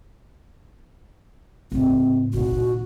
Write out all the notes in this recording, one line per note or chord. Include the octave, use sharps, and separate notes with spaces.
A2 C#3 C4
A#2 D#3 F#4